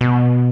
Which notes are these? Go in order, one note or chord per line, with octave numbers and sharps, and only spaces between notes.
B2